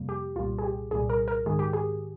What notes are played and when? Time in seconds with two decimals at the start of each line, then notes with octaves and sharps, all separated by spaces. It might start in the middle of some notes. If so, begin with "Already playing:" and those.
Already playing: F2 C3 G3 A#3
0.09 G4
0.36 C2 A#2 G3 F4
0.58 G#4
0.64 G4
0.91 C2 A#2 G3 G#4
1.10 A#4
1.28 A#4
1.46 G#2 D#3 G#3 G#4
1.59 G4
1.73 G#4